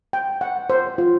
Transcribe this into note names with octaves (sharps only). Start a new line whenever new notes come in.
G5
F#5
C5
F4